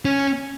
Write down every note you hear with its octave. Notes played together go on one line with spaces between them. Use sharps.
C#4